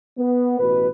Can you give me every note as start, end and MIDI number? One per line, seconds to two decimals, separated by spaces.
0.18 0.56 59
0.59 0.87 33
0.59 0.87 47
0.59 0.87 71